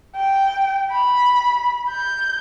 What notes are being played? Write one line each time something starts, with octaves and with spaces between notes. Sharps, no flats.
G5
B5
G6